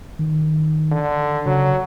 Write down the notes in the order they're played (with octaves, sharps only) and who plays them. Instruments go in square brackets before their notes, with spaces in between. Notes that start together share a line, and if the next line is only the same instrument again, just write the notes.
[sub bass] D#3
[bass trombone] D3
[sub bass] C#3 [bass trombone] F#3